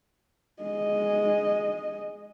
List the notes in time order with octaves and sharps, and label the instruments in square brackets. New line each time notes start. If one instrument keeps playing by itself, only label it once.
[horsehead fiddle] G#3 D#5